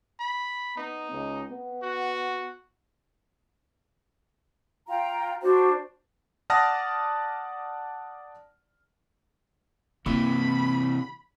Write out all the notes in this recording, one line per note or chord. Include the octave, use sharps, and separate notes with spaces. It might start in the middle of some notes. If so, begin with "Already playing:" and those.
B5
B3 D#4
C#2
B3
F#4
F4 G5 A#5
D4 F#4 C5
D5 F#5 A5 D#6 F6 A#6
C3 E3 A#3 B5